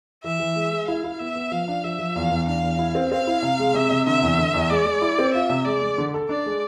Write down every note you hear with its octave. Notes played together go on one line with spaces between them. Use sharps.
E3 E5
E3
G#3
G#3
E4 F5
E4
B3 E5
B3
F3 F5
D4
F3 E5
F3
E2 F5
E2
D4 F5
E2
E4
C4
C4 F5
E4
C3
G#3
C3 E5
C3
D3 E5
E2
D3
E2
G#3 D5
G#3
E4
C4
F4 E5
C3
G#3 D5
G#3
D3
A4
D4 D5
G#3